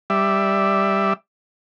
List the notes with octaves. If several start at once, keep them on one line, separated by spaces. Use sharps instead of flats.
G3 D5 E5